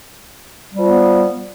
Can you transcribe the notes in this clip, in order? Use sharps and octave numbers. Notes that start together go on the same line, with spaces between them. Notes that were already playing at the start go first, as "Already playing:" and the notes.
F3 G3 B3